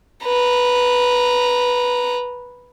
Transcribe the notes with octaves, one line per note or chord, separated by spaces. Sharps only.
B4 A#5